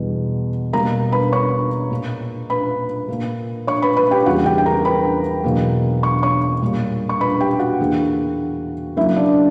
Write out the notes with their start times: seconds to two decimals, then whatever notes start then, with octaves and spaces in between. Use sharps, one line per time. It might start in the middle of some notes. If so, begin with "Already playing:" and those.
Already playing: E2 B2 G3
0.73 B2 G3 A#3 A#4 A#5
1.12 B4 B5
1.32 C#5 C#6
1.90 A#2 A#3
2.50 B4 B5
3.08 A#2 A#3
3.67 C#5 C#6
3.82 B4 B5
3.97 B4 B5
4.11 G4 G5
4.26 E2 C#3 G3 A#3 F#4 F#5
4.46 G4 G5
4.58 G5
4.66 A#4 A#5
4.85 B4 B5
5.44 E2 B2 F#3 A#3
6.03 C#6
6.23 C#5 C#6
6.62 A#2 G3 A#3
7.09 C#6
7.21 B4 B5
7.40 G4 G5
7.59 F#4 F#5
7.79 E2 D3 A#3
8.97 F#2 C#3 F#3 A#3 E4 E5
9.16 D4 D5